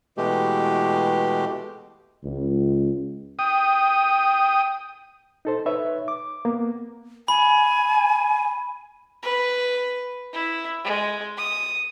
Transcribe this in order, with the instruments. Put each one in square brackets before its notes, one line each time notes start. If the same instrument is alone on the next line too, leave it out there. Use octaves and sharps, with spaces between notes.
[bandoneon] B2 E3 G#3 A3 G4
[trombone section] C#2
[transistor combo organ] G5 D#6
[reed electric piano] D#4 A4 C5
D#4 B4 C#5 E5
D6
A#3 B3
[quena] G#5 [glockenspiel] B5
[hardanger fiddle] B4
E4
G#3
D#6